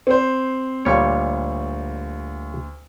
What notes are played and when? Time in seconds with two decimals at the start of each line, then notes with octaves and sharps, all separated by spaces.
0.07 C4 C5
0.85 D2 A#2 G3 C#5 C#6